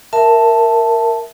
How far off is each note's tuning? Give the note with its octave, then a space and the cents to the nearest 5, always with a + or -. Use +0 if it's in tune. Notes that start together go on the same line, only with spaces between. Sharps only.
A#4 -5 E5 +10 A5 +0